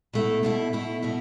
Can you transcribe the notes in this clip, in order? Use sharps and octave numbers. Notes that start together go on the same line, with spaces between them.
B2 A3 E4
B2 A3 E4
B2 A3 E4
B2 A3 E4